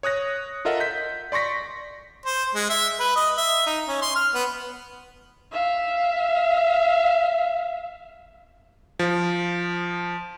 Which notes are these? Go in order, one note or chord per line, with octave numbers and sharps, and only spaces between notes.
C#5 D#6 F#6 A#6
F4 A4 A#4 D#5 E5 F#5
G6 B6
D5 C6 C#6 A#6 B6
C5
G#3
E5
B4
D#5
E5
D#4
C#4
C6
F6
B3
E5 F5
F3